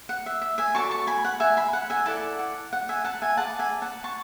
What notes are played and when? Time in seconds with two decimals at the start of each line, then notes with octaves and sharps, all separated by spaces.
0.09 F#5
0.26 E5
0.42 E5
0.58 E5 G#5
0.75 F#4 A4 D5 A5 C#6
0.91 A5 C#6
1.07 G#5 B5
1.25 F#5
1.40 E5 G#5
1.57 G#5 B5
1.73 F#5
1.90 E5 G#5
2.06 E4 A4 D5 F#5 A5
2.39 F#5
2.73 F#5
2.89 E5 G#5
3.04 F#5 A5
3.22 E5 G#5
3.37 G#4 B4 D5 F#5 A5
3.59 E5 G#5
3.82 F#5 A5
4.04 A5 C#6